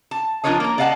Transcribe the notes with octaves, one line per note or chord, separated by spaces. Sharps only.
A5
F3 D4 F4 A#4 C#5 D#5
A#3 A#4
D5 D#5 F5 F#5 G#5 A5